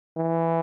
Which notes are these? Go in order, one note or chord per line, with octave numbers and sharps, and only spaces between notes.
E3